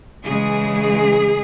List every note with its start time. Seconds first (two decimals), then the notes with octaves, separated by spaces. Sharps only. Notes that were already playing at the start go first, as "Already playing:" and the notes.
0.25 C#3 E3 G#3 G#4